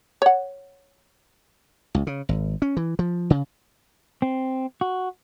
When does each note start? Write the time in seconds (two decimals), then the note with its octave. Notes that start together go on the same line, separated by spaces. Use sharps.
0.22 C#5 F#5
1.95 C#2
2.07 C#3
2.29 G#1
2.62 C#4
2.77 E3
2.99 F3
3.30 C#3
4.22 C4
4.81 F#4